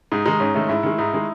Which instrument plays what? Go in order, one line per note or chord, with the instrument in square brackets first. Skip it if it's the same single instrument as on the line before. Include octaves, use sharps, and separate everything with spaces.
[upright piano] G#2 [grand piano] D#4
[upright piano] D#3 G#3 [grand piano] D#4
[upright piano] G#2 [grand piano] C#4
[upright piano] D#3 G#3 [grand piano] A3
[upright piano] G#2 [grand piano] E4
[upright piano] D#3 G#3
[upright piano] G#2 [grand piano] D#4
[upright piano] D#3 G#3